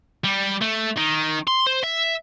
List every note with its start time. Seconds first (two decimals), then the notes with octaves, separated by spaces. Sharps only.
0.24 G3
0.61 A3
0.97 D#3
1.48 C6
1.67 C5
1.84 E5